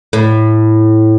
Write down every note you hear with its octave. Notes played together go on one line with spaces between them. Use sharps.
A2